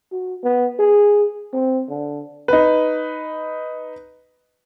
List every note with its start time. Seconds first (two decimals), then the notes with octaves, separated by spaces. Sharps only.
0.12 F#4
0.43 B3
0.79 G#4
1.53 C4
1.89 D3
2.48 D#4 B4